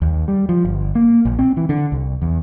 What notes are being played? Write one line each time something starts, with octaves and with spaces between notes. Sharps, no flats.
D#2
G3
F3
G1
A#3
A#1
C4
E3
D3
C2
E2